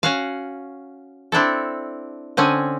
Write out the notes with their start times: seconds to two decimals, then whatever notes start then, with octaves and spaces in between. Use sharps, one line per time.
0.03 C#4 F#4 F5
1.32 C4 D4 E4 A4
2.37 D3 C4 C#4 G#5